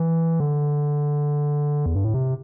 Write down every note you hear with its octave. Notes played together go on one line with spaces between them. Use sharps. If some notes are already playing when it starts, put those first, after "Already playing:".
Already playing: E3
D3
E2
G2
A2
C3